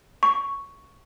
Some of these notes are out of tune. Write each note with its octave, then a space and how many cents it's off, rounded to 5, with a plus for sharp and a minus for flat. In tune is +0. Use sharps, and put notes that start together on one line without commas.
C#6 +5